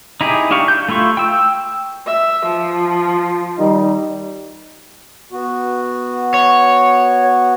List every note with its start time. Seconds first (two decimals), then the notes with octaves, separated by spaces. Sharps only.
0.21 D#4 E4 G4 G#4
0.51 D4 G4 F5 C#6
0.68 G6
0.88 A3 E4 F4 C#6
1.17 G5 E6
2.07 E5
2.46 F3
3.58 D#3 G3 D#4
5.32 B3 F#4
6.34 C#5